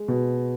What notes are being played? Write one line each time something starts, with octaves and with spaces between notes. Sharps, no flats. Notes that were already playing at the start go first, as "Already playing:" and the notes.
Already playing: G#3
B2